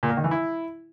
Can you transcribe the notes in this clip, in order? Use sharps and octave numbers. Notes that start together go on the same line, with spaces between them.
A#2
A#3
D#3
E3
E4